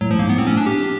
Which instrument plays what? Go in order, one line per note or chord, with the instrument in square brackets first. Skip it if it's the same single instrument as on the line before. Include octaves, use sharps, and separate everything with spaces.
[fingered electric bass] A2 [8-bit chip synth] F#3
[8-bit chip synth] F3
[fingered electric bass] G2
[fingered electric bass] G#2 [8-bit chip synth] A#3
[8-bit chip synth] B3
[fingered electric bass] A2 [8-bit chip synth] C4
[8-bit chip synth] C#4
D4
G4